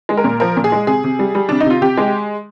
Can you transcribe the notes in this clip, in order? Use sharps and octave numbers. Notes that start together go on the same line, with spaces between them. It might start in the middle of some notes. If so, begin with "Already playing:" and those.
G#3
A#4
A#2
F3 A#4
A#2
G#4
G#3
C3 G#4
C3
G3
G3
C3 D4
D#4
C3 F4
C3 G4
G#3